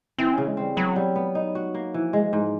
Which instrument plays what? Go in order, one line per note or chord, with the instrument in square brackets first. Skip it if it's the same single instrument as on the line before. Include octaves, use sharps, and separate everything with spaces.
[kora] E3 [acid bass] C4
[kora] C#3 [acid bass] C#4
[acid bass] G#3
[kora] C4
[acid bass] G3
[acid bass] F#3 [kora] B3
[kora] G3
B3
D#4
F#4
A#3
[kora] E3 [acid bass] F3
[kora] G#3
G#2